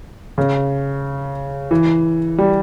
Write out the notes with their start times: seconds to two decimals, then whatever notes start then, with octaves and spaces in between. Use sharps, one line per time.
0.38 C#3
1.71 E3
2.38 G3